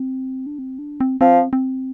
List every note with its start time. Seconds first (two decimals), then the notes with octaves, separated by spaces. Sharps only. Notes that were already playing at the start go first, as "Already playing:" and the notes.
Already playing: C4
0.46 D4
0.59 C4
0.79 D4
1.01 C4
1.21 F3 C4
1.53 C4